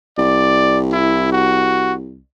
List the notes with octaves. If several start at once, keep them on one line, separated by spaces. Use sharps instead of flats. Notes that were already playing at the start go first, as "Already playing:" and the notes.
C2 D5
E4
F#4